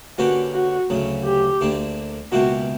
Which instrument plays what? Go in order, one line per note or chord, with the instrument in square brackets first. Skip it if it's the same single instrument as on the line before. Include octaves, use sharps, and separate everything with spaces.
[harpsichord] D3 A#3 C#4 G4 B4 [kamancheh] F#4
[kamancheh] F#4
[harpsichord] D2 C#3 F#3
[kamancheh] G4
[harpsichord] D2 D3 A#3 D4
[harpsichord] C#2 B2 A#3 E4 G4 [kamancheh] F#4